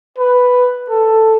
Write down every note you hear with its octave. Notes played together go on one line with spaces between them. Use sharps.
B4
A4